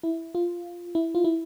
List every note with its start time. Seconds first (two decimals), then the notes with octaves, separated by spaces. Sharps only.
0.03 E4
0.35 F4
0.95 E4
1.15 F4
1.24 E4